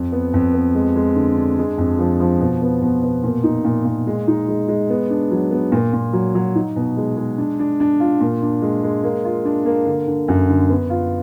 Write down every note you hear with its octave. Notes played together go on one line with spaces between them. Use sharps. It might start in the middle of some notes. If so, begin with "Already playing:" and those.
Already playing: F2
B3
F2
B3
G#3
G#3
D3
D4
G#3
F2
F3
F3
B2
B3
B2
B2
A#2
D#4
A#2
A#2
G#3
D#4
G#3
G#3
B3
D4
F#3
B3
A#2
A#2
F#3
F#3
D#4
B2
G#3
G#3
D4
D4
D4
F4
A#2
D4
G#3
G#3
A#3
F4
D4
A#3
D3
D3
F#2
D3
B3
F4